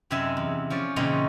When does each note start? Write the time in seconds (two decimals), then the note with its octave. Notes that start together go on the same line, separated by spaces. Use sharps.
0.10 F#2 C3 C4 D#4 E5 G#5
0.37 E2
0.70 F3 C#4 D5
0.96 E2 A#2 C#3 C4 D#4 A#5